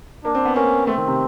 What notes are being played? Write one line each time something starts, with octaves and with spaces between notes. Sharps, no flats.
A#3 D4
C4
B3
A#3 C#4
A3 C4
D#3
C3